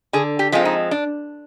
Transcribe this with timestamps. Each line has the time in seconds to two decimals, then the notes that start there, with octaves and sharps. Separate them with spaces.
0.13 D3 G#4
0.39 G4
0.52 F3 G#3 C4 F4
0.65 D#4
0.91 D4